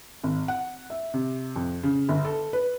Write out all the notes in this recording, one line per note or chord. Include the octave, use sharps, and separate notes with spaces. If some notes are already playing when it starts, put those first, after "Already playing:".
G#1
F#5
E5
C3
F2
C#3
G1
A4
B4